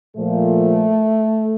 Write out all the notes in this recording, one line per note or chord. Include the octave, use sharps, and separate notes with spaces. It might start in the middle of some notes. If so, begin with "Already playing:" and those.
A#2 F3 A3